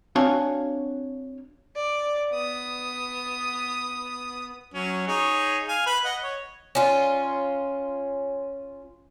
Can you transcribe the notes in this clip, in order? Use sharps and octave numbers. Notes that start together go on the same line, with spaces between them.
C4 D4 F#4 C#5 F5 G#5
D5
B3 D#6
F#3 C#4
D#4 G#4 C#5
F5 G#5
B4 B5
D#5 F#5
C#5
C#4 F4